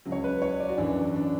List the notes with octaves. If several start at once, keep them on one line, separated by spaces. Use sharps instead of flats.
C#2 C#3 F#3
C#5
B4
C#5
D5
F#4
F#2 E3 D4
D4